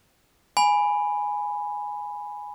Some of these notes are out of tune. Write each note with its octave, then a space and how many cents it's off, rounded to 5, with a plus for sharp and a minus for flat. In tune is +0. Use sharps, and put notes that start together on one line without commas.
G#5 +0 B5 +0